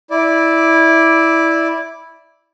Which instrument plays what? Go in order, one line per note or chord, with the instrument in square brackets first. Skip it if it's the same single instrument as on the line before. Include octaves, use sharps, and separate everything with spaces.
[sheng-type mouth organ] E4 D5